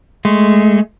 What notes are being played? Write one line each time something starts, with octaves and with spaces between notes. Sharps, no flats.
G#3 A3